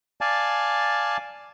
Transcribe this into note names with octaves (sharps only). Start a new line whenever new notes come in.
D5 F5 G#5 A5